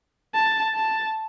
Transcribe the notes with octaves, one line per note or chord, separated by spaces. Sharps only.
A5
A5